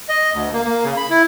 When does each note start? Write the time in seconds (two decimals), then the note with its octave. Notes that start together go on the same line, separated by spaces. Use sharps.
0.09 D#5
0.33 D2
0.53 A#3
0.65 A#3
0.84 C#3
0.97 B5
1.10 E4